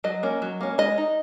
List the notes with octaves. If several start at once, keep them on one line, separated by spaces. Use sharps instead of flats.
F#3 D#5
A#3 C#4
F#3
A#3 C#4
G#3 D#5
D#4